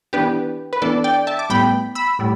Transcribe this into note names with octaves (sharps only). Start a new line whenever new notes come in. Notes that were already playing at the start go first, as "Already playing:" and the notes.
E3 B3 D4 G4 B4
B4
E3 B3 D4 A4 D5
D5 G5
E5 A5
D6
A2 G3 B3 G5 B5
B5 E6
A2 G3